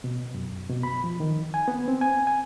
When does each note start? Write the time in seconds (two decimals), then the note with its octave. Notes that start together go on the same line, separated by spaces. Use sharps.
0.04 B2
0.34 F#2
0.70 B2
0.83 B5
1.04 F3
1.20 D#3
1.54 G#5
1.68 B3
1.88 C4
2.01 G#5
2.27 G#5